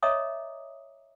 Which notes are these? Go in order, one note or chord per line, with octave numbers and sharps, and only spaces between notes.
C#5 D#5 E5 A#5 D6 D#6